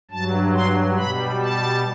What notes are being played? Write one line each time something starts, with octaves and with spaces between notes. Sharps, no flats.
G2 F#3 A5
C6
B2 G3 B5
A5